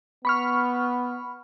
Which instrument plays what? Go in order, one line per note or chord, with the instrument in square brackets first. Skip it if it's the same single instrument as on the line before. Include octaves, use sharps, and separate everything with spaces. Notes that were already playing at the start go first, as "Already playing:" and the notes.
[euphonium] B3 [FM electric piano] B5 C#6 F6